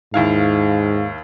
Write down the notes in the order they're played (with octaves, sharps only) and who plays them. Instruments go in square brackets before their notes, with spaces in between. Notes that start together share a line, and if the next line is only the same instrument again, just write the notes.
[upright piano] D#2 E4 F5 [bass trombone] G#2